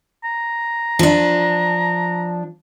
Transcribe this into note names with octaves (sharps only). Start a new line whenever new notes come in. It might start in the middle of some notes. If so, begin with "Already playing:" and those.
A#5
F3 D4